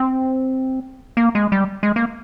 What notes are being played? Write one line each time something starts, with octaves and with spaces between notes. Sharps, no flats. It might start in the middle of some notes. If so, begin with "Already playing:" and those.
Already playing: C4
A#3
G#3
G3
G#3
A#3